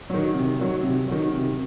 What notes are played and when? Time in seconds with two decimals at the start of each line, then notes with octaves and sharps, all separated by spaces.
0.10 D#3 F#3
0.34 C3
0.59 D#3 F#3
0.83 C3
1.08 D#3 F#3
1.32 C3